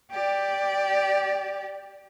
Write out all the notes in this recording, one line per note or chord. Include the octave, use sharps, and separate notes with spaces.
G4 D5